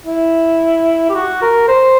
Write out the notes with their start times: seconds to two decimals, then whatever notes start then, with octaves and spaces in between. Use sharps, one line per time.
0.06 E4
1.09 G4
1.15 F#4
1.42 A#4
1.68 C5